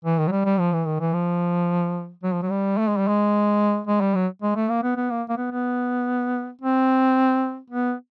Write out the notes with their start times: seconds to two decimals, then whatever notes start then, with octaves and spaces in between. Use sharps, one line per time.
0.05 E3
0.18 D#3
0.27 F#3
0.31 G3
0.45 G3
0.59 F3
0.73 E3
0.87 D#3
1.00 E3
1.13 F3
2.23 F#3
2.33 F3
2.42 F#3
2.50 G3
2.78 A3
2.88 G#3
2.98 G3
3.08 G#3
3.87 G#3
4.01 G3
4.15 F#3
4.42 G#3
4.55 A3
4.69 A#3
4.83 B3
4.96 B3
5.10 A#3
5.29 A#3
5.37 B3
5.52 B3
6.61 C4
7.70 B3